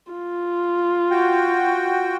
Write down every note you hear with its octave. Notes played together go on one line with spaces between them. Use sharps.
F4
F#4 G5